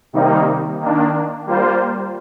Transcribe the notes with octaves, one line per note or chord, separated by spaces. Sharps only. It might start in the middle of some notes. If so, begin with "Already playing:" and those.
C3 D#3 G3 A#3 D#4
D#3 A#3 D4
G3 A#3 F4 C5